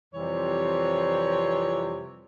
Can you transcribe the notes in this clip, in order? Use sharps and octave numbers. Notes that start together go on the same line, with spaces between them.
F2 C3 E3 G3 C#5